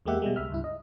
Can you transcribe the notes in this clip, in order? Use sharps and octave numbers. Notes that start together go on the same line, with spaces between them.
E2 G#3 A#3 G4 E5 F#5
B2 G3 G#3
C2 E5 F6
C#2 G2 E4
D#5